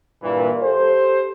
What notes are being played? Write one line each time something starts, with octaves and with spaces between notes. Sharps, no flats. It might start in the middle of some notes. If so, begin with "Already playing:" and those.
G2 A#2 E3
G4 A4 C5